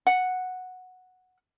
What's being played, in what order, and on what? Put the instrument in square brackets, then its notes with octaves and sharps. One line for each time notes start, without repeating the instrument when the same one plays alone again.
[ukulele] F#5